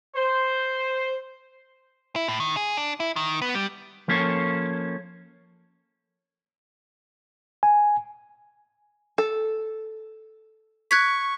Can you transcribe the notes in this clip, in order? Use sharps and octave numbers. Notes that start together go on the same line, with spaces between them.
C5
E4
A2
D#3
G#4
D4
E4
D#3
B3
G3
F3 A#3 C#4 A4 C#5
G#5
A4
C#6 F#6 G#6 B6